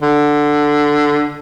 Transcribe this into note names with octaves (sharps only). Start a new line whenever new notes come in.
D3